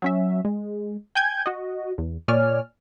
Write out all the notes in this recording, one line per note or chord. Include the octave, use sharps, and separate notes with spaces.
F#3 C#4 E5
G#3
G5 G#5 G6 G#6
F#4 D#5
E2
A#2 C#5 D5 G#5 F6